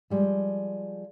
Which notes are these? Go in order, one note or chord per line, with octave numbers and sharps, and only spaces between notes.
F3 G3 G#3